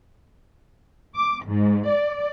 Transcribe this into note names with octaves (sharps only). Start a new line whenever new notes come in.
D6
G#2
D5